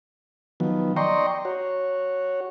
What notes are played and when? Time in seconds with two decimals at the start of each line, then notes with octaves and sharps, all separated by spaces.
0.60 D#3 F3 F#3 B3
0.96 D5 D#5 G5 A#5 C6 C#6
1.45 F#4 C#5